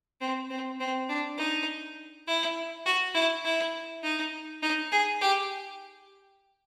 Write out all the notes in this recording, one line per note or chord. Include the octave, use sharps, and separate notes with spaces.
C4
C4
C4
D4
D#4
E4
F#4
E4
E4
D#4
D#4
G#4
G4